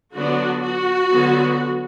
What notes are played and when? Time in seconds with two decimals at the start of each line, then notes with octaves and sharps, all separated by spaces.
0.13 D3 F#3 B3 D4 F#4
0.63 F#4
1.11 D3 F#3 B3